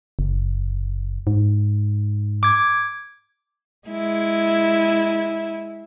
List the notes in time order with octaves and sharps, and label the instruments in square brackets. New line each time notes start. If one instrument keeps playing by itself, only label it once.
[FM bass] F#1
G#2
[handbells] D6 G#6
[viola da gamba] G#3 E4